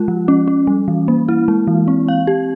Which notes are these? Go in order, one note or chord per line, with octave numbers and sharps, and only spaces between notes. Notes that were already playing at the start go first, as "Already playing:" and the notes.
Already playing: G#3 F4
F3
C#4
C#4
G3
E3
A#3
E4
G#3
E3
C4
F5
G4